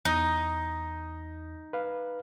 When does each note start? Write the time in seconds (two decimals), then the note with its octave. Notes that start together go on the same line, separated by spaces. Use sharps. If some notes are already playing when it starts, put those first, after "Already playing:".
0.05 E2 D#4 D#6
1.73 B4 F5